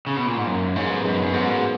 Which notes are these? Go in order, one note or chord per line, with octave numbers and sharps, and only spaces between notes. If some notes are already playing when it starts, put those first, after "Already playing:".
C#3
B2
A#2
G#2
F#2 A#3 C#4
G#2 A#3 C#4
G#3 B3
F#2 G#3 B3
F#2 A#3 C#4
G#2 G#3 B3
F#3 A#3